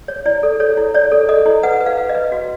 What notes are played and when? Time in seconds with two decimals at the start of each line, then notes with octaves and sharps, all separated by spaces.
0.08 C#5
0.26 E4 D5
0.43 A4
0.60 A4 C#5
0.77 E4
0.94 C#5 D5
1.12 A4
1.29 A4 D#5
1.46 E4
1.63 B4 F#5
1.80 B4
1.86 F5
1.98 B4
2.09 D#5
2.15 B4
2.32 F#4